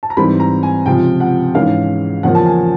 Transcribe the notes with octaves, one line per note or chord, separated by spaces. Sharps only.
A5
A#5
G#2 E3 G3 C4 B5
A#5
G#5
C#2 C3 F3 G5
F#5
G#2 E3 G#3 C#4 F5
E2 C#3 F3 A#3 C#4 F#5
A5
G#5